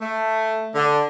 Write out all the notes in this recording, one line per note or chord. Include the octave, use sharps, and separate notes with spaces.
A3
D3